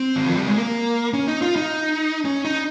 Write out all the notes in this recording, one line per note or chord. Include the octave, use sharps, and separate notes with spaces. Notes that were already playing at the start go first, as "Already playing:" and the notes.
Already playing: C4
D#3
F3
G3
G#3
A#3
C#4
D#4
F4
D#4
C#4
D#4